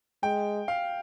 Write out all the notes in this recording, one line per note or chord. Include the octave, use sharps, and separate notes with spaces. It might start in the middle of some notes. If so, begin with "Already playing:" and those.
G#3 G5
F5